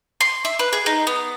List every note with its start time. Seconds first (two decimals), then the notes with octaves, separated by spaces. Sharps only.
0.21 C6
0.45 E5
0.59 B4
0.73 G#4
0.86 D#4
1.07 B3